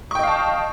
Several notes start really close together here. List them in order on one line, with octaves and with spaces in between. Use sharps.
C#6 G5 D#5 F5 A5